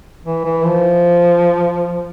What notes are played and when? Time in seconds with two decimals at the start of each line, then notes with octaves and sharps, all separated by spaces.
0.25 E3
0.45 E3
0.65 F3